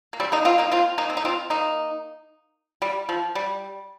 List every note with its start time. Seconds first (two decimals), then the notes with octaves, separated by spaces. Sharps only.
0.13 A#3
0.20 G3 C4
0.32 A#3 D#4
0.45 C4 F4
0.58 A#3 D#4
0.72 C4 F4
0.98 A#3 D#4
1.10 C4
1.17 D#4
1.25 C4 F4
1.50 A#3 D#4
2.82 G3
3.09 F3
3.35 G3